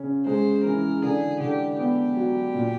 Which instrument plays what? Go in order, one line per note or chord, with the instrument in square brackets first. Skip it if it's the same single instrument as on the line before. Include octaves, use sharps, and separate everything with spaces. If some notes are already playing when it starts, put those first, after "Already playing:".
Already playing: [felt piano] C#3 C#4
[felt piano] G#3 [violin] C5
[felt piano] E3 [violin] A#4
[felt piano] D3 [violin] G#4
[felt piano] D3 [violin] G4
[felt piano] B3 [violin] G4
[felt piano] F#3
A#2